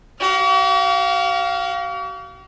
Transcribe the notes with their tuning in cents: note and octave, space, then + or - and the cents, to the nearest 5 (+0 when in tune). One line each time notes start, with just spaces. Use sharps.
F#4 +45 F5 +0